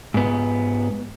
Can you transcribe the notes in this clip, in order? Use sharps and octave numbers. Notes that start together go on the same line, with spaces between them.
G#2 B3